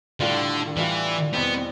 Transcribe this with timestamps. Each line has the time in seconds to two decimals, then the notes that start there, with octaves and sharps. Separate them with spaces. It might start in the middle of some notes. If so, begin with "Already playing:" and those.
0.20 A2 D3 G3 D4 F4
0.76 A2 E3 G3 D4 F4
1.33 E2 B2 G3 B3 C4